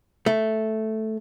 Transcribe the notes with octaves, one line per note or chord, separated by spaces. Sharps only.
A3